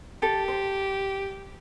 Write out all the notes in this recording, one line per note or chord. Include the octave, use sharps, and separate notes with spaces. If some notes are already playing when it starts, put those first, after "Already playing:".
G4 A4
C5